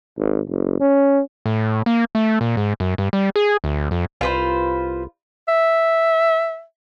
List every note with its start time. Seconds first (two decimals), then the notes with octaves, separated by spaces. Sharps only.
0.18 G#1
0.49 F#1
0.81 C#4
1.46 A2
1.86 A#3
2.15 A3
2.41 A#2
2.57 G#2
2.80 F#2
2.98 G2
3.13 G3
3.36 G#4
3.64 D2
3.91 F2
4.21 C2 F4 B4 C5
5.48 E5